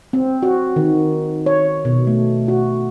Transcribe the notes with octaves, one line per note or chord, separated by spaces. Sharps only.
C4
F#4
D#3
C#5
B2
A3
F#4